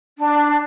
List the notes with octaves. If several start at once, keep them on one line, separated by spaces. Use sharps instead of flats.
D4